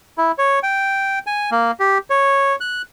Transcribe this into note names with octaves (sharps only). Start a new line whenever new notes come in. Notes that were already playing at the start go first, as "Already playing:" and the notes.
E4
C#5
G5
G#5
A#3
G4
C#5
F#6